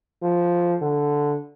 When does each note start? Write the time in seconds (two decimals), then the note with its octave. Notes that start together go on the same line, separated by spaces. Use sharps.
0.23 F3
0.82 D3